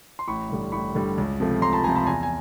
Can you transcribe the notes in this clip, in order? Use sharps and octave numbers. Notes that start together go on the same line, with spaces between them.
C6
A1 B5 C#6
G2 D3 G3
A1 B5 C#6
G2 D3 G3
C#2
C3 F3 A3
C#2 A#5 C6
A5 B5
C3 F3 A3 G#5 A#5
A5 B5
E2 G#5 A#5
G#5